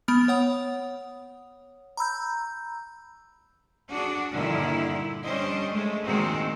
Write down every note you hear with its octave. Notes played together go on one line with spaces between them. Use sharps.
B3 B5 F6
C#5 F#5 D#6
A#5 B5 E6 G6
D4 F#4 G#4
G2 A#2 D3 D#3 E4
G3 C#4 D4 C5 D#5
G#3 A3
A#2 D#3 G#3 C4 F#4